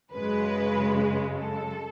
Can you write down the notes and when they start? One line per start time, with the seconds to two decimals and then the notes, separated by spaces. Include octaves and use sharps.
0.13 F#2 C#3 G#3 B4
1.35 A4